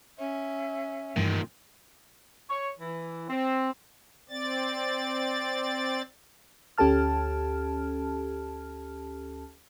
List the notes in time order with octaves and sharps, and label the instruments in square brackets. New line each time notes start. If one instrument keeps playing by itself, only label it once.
[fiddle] C#4 [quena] E5
[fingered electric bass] G2 E3 A3 [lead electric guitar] A#2 D#3
[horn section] C#5
E3
C4
[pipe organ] C4 D5 A6
[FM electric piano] D2 C#4 G4 A4 A5 F6